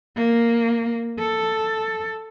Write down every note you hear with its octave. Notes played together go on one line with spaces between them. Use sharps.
A#3
A4